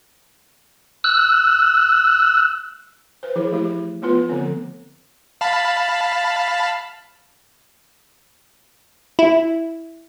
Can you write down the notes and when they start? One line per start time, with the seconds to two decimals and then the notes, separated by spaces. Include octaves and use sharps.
1.04 E6 F#6
3.23 B4 C5
3.36 E3 F3 E4 G#4
3.52 A3 E4 G4
4.02 F3 A3 B3 F4 B4
4.29 D3 F3 B3 C4
5.41 F5 A5 B5
9.19 E4